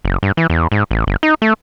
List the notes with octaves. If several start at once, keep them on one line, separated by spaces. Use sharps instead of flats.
F#1
G2
E3
E2
G#2
A1
G1
D#4
A3